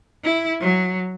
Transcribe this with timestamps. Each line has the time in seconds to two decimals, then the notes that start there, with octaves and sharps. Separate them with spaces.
0.24 E4
0.60 F#3